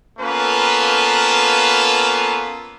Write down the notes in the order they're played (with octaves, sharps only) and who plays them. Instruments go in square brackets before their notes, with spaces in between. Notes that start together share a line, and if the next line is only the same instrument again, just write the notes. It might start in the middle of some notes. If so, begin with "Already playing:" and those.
[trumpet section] A#3 B3 C#4 F4 A4 B4